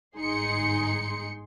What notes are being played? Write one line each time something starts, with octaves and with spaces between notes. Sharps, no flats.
G1 G#2 D#4 G#4 C6 C#7